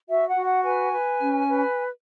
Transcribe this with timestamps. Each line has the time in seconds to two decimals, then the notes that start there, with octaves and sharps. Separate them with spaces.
0.08 F#4 E5
0.27 F#5
0.36 F#4
0.46 F#5
0.64 B4 G#5
0.92 B4
1.21 C#4
1.48 B4